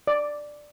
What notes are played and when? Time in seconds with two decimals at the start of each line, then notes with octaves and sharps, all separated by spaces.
0.07 D5